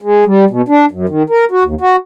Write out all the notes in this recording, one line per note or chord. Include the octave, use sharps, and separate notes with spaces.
G#3
G3
B2
D4
F#2
D#3
A#4
F#4
D#2
F#4